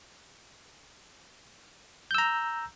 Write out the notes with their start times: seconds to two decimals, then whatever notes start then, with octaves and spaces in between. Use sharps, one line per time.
2.11 G6
2.15 E6
2.18 A#5